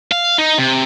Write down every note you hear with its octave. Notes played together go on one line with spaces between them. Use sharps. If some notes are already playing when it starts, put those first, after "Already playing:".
F5
D#4
C3